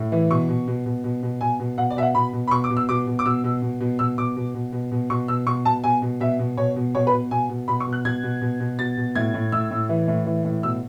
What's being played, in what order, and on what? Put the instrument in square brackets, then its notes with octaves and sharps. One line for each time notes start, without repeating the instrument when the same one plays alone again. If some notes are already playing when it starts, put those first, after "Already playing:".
Already playing: [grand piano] A2
E3
B2 C#6
B2
B2
B2
B2
B2
B2 G#5
B2
B2 F#5
D5
B2 E5
F#5
B2 B5
B2
B5
B2 C#6
D6
B2
E6
B2 D6
B2
D6
B2 E6
B2
B2
B2
B2 E6
B2 D6
B2
B2
B2
B2
B2 C#6
B2 E6
B2 C#6
B2 A5
B2 G#5
B2
B2 E5
B2
B2 C#5
B2
B2 C#5
B4
B2
B2 G#5
B2
B2 B5
C#6
B2
F#6
B2 G#6
B2
B2
B2
B2 A6
B2
A2 G#6
A2
A2 E6
A2
E3
A2
E3
A2
B2 E6